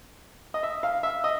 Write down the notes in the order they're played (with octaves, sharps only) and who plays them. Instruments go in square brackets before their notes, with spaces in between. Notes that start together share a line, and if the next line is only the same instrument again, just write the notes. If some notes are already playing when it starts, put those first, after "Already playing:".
[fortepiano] D#5
E5
F5
E5
D#5